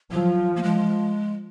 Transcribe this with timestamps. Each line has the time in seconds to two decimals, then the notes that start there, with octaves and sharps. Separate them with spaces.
0.12 F3 F#3
0.56 A#3
0.63 G#3